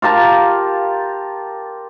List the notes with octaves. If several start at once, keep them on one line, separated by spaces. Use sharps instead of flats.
F4 G4 A#4 A5